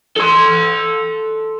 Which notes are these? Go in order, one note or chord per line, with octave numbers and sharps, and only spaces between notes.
A4 C6